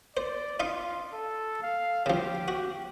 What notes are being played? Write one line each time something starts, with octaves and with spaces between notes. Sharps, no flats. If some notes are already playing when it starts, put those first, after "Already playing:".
C5 D5
D#4 F4 F5 C6
A4
F5
C#3 F3 G4
F#4